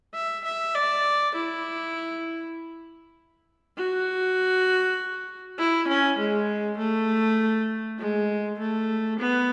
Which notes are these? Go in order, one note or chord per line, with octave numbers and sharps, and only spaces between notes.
E5
E5
D5
E4
F#4
E4
C#4
G#3
A3
G#3
A3
B3